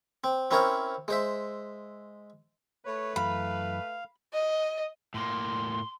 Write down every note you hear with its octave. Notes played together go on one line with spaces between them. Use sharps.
C4
C4 C#4 E4 A#4 C5 C#5
G#3 C5 E5
A3 B4 C#5
F#2 E3 F5 A#5 B5
D#5
A2 A#3 C6